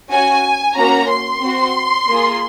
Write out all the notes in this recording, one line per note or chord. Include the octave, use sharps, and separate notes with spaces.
C#4 F#4 G#5
A#3 C#4 F#4 A#5
C6
C4 F#4
A#3 F4 G#4